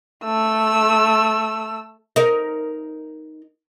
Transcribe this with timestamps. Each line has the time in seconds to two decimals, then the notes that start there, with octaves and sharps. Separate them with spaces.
0.24 A3 E6
2.16 D#4 A#4